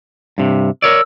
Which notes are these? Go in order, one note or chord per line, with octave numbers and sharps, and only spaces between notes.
G2 C3
A#4 C#5 D5 E6